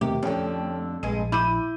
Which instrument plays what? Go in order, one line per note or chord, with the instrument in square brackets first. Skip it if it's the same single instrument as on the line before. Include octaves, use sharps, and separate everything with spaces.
[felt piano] E1 D#2 C3 [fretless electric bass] A3 [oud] G4
[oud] F2 D3 [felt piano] C#4 G5
[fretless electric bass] A#1 [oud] G2 G#3 [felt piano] D#7
[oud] E4 [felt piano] D6 G6 D#7